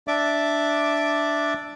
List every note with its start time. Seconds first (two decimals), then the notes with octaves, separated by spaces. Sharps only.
0.08 D4 D5 E5 D6